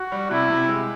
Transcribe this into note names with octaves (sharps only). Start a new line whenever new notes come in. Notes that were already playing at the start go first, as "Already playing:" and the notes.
Already playing: F#4
G3
C3 E4
C3
G#3